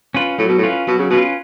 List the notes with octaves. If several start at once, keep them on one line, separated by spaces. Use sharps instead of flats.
C#4 F4 B4
A2 F#3
B2
A2
C#4 F4 B4
B2 F#3
C#3
B2 C#4 F4 B4